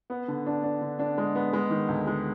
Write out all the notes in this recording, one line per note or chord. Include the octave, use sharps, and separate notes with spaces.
B3
D3
D4
D4
D3
D4
G#3
B3
G#3
D#3
D2
G#3